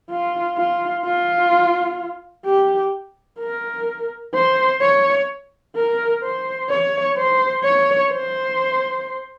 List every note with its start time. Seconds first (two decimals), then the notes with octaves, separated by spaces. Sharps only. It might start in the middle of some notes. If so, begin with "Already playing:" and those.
0.10 F4
0.57 F4
1.04 F4
2.46 G4
3.39 A#4
4.34 C5
4.81 C#5
5.76 A#4
6.23 C5
6.70 C#5
7.17 C5
7.63 C#5
8.11 C5